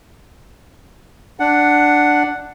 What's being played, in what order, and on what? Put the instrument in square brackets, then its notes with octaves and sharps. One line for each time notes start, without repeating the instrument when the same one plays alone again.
[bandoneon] D4 F#5